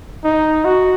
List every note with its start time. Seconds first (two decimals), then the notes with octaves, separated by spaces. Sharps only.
0.24 D#4
0.65 F#4